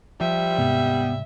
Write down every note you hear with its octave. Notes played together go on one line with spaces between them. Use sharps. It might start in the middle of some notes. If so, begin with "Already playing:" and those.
F3 G3 E5
D#2 G#2 C3 B3